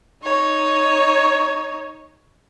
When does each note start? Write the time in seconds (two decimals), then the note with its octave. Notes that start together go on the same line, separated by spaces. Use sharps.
0.23 D#4 C#5